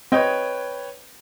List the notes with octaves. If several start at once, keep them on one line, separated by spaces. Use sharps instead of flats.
C4 B4 C#5 D#5 G5